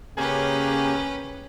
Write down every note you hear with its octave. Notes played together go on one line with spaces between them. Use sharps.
C#3 A#3 C#4 G4 G#4 B4